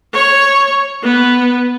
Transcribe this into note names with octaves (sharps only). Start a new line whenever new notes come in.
C#5
B3